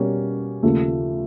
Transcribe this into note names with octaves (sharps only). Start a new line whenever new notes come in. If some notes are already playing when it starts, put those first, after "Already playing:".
Already playing: B2 G3 A#3 C#4
D#2 C#3 F3 A3